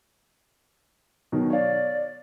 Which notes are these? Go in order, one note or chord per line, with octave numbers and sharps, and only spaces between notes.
B2 D#3 F#3
C#5 D5 F5